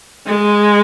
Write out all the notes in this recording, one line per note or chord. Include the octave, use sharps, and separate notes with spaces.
G#3